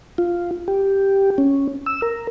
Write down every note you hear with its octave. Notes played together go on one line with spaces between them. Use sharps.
F4
G4
C#4
E6
A#4